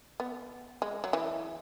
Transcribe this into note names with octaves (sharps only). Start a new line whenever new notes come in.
B3
G#3
F#3
E3